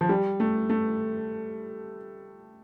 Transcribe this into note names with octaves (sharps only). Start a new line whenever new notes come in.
F3
G3
A3
A3